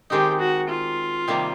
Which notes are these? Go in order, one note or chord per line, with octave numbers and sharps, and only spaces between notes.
D#3 G#3 C4 D#4 G4
F#4
F4
C3 D#3 G3 A#3